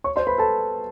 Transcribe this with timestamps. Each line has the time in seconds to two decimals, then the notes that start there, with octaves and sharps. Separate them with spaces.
0.04 C#5 C#6
0.16 C5 C6
0.27 B4 B5
0.38 A4 A5